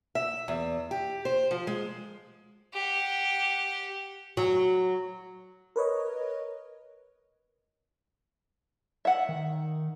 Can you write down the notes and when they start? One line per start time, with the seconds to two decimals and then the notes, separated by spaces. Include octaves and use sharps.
0.15 E5
0.48 E2
0.91 G4
1.25 C5
1.51 F3
1.67 G#3
2.73 G4 F#5
4.37 F#3
5.76 A#4 B4 C#5 D#5
9.05 E5 F#5
9.29 D#3